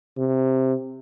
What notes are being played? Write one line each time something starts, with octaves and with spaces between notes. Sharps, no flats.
C3